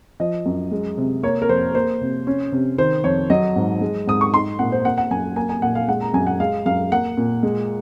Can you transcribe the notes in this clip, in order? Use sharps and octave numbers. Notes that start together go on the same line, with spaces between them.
F3 D#5
F#2
G#3
C3
A#3 C#5
A#4
F2 C5
A#3 C5
C3
C#4
C3
D#3 C5
F2 C#5
F#3 D#5
G#2
G#3
G#2 D#6
C#6
D#4 C6
A#2 F#5
C5
A#3 F#5
F#5
F#2 G#5
A#3 G#5
G#5
A#2 F#5
F5
G#3 F#5
A#5
F#2 G#5
F#5
G#3 F5
F#2 F5
A#3 F#5
A#2
G#3